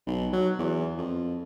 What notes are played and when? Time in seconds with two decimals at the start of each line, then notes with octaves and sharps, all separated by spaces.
0.07 B1
0.33 F#3
0.59 E2
0.98 F2